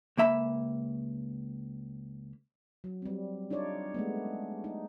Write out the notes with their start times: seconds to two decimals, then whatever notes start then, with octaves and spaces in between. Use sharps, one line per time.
0.18 C#2 A#3 E5 A#5 B5
2.84 F#3
3.02 G3 C4
3.50 D4 D#4 F4 C#5 D5
3.94 G#3 A3 B3
4.64 D#4